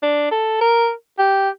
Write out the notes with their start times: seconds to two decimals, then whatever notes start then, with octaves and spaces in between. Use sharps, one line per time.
0.02 D4
0.31 A4
0.61 A#4
1.19 G4